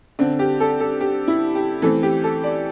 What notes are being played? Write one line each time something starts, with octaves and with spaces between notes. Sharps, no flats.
D3 C4
G4
A4
A4
G4
E4
G4
E3 A3 C4 A4
G4
A4
D5